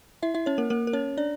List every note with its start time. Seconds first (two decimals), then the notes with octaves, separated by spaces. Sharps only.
0.23 E4 E5
0.34 E4 E5
0.46 C#4 C#5
0.58 A#3 A#4
0.70 A#3 A#4
0.87 A#4
0.93 C#4 C#5
1.17 D4 D5